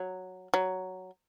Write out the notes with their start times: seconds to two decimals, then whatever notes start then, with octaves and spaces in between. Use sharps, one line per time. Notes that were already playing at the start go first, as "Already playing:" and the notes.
Already playing: F#3
0.54 F#3